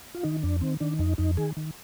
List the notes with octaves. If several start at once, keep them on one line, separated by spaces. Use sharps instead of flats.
F4
D#3 D#4
F2 D4
D#3 C4
D#3 D4
F2 D#4
F2 D#4
D#3 G#4
D#3